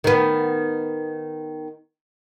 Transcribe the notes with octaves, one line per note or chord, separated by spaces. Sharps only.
D#3 B3